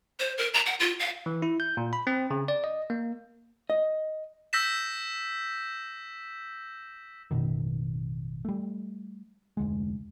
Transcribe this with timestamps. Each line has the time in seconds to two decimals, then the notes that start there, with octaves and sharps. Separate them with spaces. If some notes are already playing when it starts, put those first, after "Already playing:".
0.20 C5
0.38 A#4
0.54 A#5
0.66 F#5
0.80 F4
1.00 F5
1.26 E3
1.42 E4
1.60 G6
1.77 A#2
1.93 B5
2.07 C4
2.31 C#3
2.48 D5
2.64 D#5
2.90 A#3
3.70 D#5
4.53 E6 G6 A#6 B6 E7
7.31 A1 F#2 B2 D#3
8.45 G3 A3
9.57 F1 D2 G#3